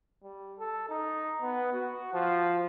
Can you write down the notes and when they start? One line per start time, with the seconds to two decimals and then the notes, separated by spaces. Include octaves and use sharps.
0.23 G3
0.59 A4
0.89 D#4
1.41 B3
1.73 F#4
2.14 F3